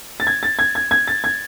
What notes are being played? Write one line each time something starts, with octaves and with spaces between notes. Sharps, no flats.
A6
G#6
A6
G#6
G#6
G#6
A6
G#6